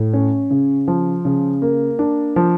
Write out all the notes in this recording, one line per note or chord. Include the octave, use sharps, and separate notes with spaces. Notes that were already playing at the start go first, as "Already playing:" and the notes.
Already playing: A2
C#4
C#3
F3
C#3
A#3
D4
F3